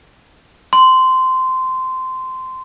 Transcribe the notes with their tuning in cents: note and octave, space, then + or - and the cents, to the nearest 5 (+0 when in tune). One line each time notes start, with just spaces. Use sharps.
C6 -15